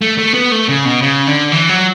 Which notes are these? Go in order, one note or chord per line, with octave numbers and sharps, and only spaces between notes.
A3
A3
B3
A3
C#3
B2
C#3
D3
E3
F#3